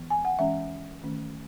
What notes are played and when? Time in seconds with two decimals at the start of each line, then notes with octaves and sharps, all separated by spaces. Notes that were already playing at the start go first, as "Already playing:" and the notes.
Already playing: E3 B3
0.10 G#5
0.25 F#5
0.39 E3 G#3 C#4 E5
1.04 D#3 A3 C#4